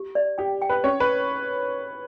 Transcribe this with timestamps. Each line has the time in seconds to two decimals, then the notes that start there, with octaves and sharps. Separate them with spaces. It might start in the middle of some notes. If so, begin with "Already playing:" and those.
Already playing: G4
0.15 D5
0.38 G4 G5
0.62 G5
0.70 B4
0.84 C#4 C#5
1.00 B4